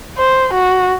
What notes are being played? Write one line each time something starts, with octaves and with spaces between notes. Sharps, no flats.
C5
F#4